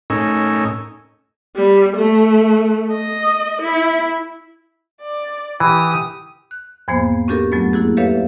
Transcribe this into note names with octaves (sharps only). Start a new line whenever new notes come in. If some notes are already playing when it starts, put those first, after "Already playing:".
A2 C#4 D#4 A#4 G#5 E6
G3
A3
D#5
E4
D5
E3 G4 D#6
F#6
E2 G#2 F3 A#3 B3 C5
C#4 D4 F#4 G4 A4 A#4
F2 F#3 A3 B3
A#3 E4 F#4 G#4
G4 A4 B4 C#5 E5 F5